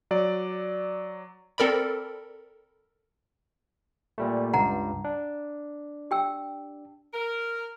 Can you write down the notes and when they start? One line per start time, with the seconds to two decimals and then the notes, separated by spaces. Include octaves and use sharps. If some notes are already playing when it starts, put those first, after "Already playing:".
0.11 F#3 D5
1.58 C4 A4 A#4 D5 B5
4.18 A#2 G3 A3
4.53 C#2 G2 F#5 A#5
5.04 D4
6.11 G4 G5 E6
7.14 A#4